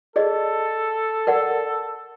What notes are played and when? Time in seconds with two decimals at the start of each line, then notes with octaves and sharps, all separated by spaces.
0.16 G#4 A4 D5 D#5
1.27 A#4 D5 F#5